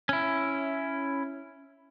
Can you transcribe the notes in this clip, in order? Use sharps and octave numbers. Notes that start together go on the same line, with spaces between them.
C#4 E4